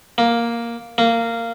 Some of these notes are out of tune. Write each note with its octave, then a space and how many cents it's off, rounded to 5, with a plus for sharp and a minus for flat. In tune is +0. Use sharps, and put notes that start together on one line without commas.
A#3 +5
A#3 -15